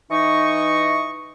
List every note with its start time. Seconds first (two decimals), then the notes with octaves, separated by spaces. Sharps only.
0.11 E3 D#4 D#5 C#6